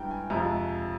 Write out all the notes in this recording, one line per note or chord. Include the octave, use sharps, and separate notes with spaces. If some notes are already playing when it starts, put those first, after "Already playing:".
Already playing: G2 E3 G#3 G5 A#5
G#5
F2 C3 F3 G#3 A#5